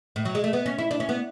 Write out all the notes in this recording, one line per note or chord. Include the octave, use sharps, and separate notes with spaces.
A2
F#3
G#3
A3
B3
C#4
E4
D4
C#4
B3